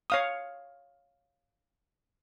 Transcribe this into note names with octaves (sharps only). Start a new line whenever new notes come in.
C#5 F5 D#6